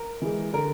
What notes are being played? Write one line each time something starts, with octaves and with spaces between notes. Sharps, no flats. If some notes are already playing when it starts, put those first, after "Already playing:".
Already playing: A#4
E3 G#3
D3 A#4